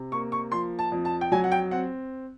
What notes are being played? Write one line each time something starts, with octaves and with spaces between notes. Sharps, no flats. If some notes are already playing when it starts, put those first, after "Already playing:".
Already playing: C3
A#3 C#6
C#6
F3 C6
A5
F2
A5
G5
F#3 G#5
F#5
G5
C4 F#5